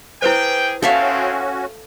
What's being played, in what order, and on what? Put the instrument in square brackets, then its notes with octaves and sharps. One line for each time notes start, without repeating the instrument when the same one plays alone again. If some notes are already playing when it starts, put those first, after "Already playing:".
[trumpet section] G3 G#4 G5 [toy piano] E4 B4 C5
[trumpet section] G#3 C4 [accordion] C#4 F#4 [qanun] A4 E5 F5